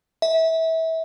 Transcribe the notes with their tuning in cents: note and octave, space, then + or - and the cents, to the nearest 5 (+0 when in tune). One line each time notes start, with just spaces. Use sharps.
E5 -25